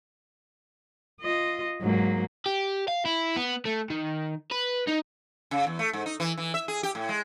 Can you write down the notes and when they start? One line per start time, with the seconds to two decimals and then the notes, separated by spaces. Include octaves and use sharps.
1.21 F4 D#5
1.80 G#2 F#3 A#3
2.46 G4
2.88 F5
3.05 E4
3.36 B3
3.66 A3
3.90 D#3
4.52 B4
4.88 D#4
5.51 C#3
5.67 E2
5.79 A3
5.93 G#2
6.06 D#4
6.20 E3
6.37 E3
6.54 E5
6.68 G#4
6.83 G4
6.95 A2
7.09 G#3